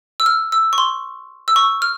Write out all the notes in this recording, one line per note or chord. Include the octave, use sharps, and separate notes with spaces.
E6
F6
E6
C#6
C6
E6
C#6
F6